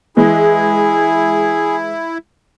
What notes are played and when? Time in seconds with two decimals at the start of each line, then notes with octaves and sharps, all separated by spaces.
0.17 E3 G#3 E4 G#4